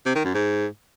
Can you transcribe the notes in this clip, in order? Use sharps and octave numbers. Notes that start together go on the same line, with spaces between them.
C3
D#3
F#2
G#2